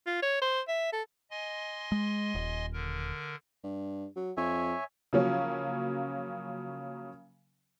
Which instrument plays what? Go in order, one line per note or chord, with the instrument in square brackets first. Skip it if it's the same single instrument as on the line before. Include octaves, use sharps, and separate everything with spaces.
[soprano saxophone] F4
C#5
C5
E5
A4
[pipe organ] D#5 G#5 C6
[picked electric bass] G#3
D#1
[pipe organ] D3 A#4
[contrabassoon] G2
F#3
[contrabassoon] F2 [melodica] C#5 E5 G#5
[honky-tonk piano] C#3 F3 F#3 A#3 C#4